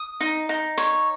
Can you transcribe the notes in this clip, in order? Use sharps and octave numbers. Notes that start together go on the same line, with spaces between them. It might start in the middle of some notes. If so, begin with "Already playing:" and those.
Already playing: D#6
D#4
D#4
C#5